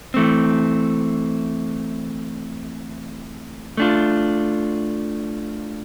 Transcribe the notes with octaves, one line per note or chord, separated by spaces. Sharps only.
E3 A3 C4
A3 D4 F4